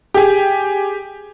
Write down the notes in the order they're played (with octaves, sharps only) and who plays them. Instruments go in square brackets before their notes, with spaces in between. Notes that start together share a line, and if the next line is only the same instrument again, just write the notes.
[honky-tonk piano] G4 G#4